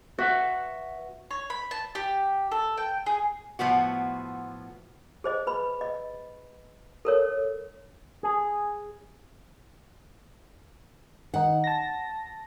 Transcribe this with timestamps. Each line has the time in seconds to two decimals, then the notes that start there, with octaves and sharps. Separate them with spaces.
0.18 F#4 B4 E5 F#5
1.31 C#5
1.50 B5
1.71 A5
1.95 G4
2.52 A4
2.77 G5
3.06 G#4
3.59 A2 F3 B3 F#4
5.24 G#4 C5 D#5
5.47 B4 B5
5.81 D#5
7.05 A4 A#4 C#5
8.23 G#4
11.34 D#3 D#4 F#5
11.64 A5 A#6